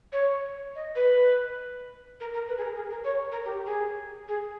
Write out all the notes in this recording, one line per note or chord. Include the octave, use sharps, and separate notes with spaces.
C#5
D#5
B4
A#4
A#4
B4
G#4
A#4
G#4
A#4
C#5
A#4
G4
G#4
G#4